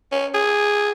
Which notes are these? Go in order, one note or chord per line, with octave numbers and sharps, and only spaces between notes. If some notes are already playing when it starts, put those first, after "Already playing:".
C#4
G#4